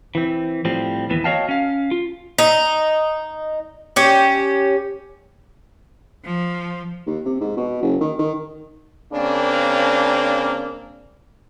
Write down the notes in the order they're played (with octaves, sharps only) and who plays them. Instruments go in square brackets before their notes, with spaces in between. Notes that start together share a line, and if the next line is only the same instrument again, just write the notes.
[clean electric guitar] E3 C4
A2 F3 G3 C4
D#2 E3 B3
F#4 C#5 D#5 F5 G5 A5
C#4 F5
F4
[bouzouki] D#4
C#4 G4
[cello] F3
[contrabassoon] D#2
C3
G#2
B2
F#1
D#3
D#3
[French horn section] C#3 A#3 C4 D4